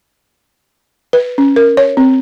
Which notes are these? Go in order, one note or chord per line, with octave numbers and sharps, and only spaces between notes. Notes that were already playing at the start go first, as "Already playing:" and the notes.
B4
C#4
A#4
C#5
C4